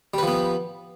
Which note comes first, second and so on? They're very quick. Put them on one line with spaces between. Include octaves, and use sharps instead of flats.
G3 B4 F3 B3